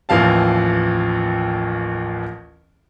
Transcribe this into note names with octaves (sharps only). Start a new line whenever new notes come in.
A1 D#2 E3 F3 F5 A5